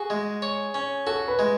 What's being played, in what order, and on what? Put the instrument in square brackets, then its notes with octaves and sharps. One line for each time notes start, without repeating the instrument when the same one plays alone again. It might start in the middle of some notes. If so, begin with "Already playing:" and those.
Already playing: [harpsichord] F#4 [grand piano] G#4
[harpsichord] G#3
C#5
C#4
[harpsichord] F#4 [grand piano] A4
[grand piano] B4
[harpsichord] G#3